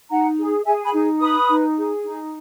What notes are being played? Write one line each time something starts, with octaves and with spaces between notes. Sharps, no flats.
D#4 F#5 A#5
G#4
G#4 E5 G#5
G#5 B5
D#4
B4 B5 D#6
D#4
G#4
D#4